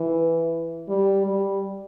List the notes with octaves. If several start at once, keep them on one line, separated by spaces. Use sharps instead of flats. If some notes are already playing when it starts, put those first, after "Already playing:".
Already playing: E3
G3
G3